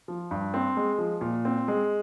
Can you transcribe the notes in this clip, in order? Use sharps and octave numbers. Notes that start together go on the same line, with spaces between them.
F3
G2
C4
G#3
F3
A#2
C4
G#3